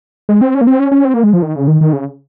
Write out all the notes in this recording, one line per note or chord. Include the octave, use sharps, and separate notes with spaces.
G#3
C4
C#4
A#3
C4
C#4
C#4
C4
A#3
G#3
F3
D#3
C#3
D#3
D#3
C#3